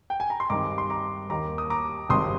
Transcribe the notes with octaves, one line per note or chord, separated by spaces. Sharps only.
G5
G#5
A#5
C6
G2 D#3 G#3 C4 A#5 D6
C6
A#5 D6
D#2 D#3 A#3 A#5 D6
D#6
A#5 D6
G#1 G2 D#3 G#3 C4 C6 D#6